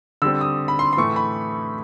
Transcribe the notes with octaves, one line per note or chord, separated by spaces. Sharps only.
D3 G3 C4 E6
D#6
B5
C6
C6
A2 E3 A3 C#6
B5